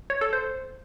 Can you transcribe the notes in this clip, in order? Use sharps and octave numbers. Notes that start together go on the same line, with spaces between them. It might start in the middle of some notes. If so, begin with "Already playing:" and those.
C#5
A4
C5